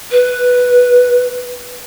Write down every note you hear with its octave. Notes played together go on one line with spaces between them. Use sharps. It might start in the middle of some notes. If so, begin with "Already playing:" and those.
B4